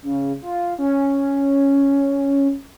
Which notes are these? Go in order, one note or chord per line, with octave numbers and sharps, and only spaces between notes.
C#3
F4
C#4